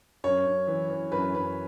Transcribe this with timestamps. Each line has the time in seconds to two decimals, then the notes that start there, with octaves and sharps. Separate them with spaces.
0.24 F#2 C#5
0.46 F#2
0.67 E3
0.89 E3
1.11 F#2 B4
1.34 F#2 B4